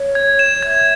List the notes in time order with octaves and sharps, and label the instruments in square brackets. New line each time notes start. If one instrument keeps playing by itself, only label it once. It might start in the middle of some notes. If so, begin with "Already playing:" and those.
Already playing: [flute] C#5
[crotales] G#6
E7
[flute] E5 [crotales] G#6